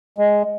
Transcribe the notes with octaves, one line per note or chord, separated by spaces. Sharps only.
G#3